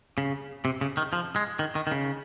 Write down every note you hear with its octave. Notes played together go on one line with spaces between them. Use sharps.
C#3
C3
C#3
D#3
F3
G#3
D#3
D#3
D#3
C#3